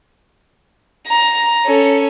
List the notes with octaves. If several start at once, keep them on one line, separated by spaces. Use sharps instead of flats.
A#5
C#4 A4